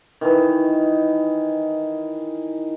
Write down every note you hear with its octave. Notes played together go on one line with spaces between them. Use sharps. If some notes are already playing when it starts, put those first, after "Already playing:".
D#3 E3 D#4